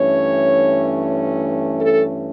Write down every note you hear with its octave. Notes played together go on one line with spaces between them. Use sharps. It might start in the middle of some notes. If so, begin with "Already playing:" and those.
Already playing: G2 E3 A3 C#4 C#5
A4